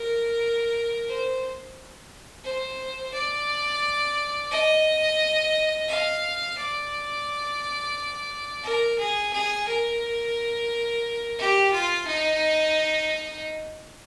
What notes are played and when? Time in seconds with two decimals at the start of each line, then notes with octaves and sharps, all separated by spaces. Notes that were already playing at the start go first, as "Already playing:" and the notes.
Already playing: A#4
1.08 C5
2.44 C5
3.14 D5
4.51 D#5
5.88 F5
6.58 D5
8.63 A#4
8.98 G#4
9.33 G#4
9.67 A#4
11.39 G4
11.72 F4
12.07 D#4